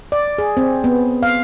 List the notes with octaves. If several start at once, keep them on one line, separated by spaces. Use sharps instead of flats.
D5
G#4
C4
B3
F5